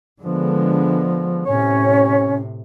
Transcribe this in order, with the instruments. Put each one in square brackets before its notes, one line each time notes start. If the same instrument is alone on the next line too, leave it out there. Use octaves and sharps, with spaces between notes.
[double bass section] D3 G#3 B3 [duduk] F3
[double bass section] A2 C3 [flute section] C#4 [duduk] C#5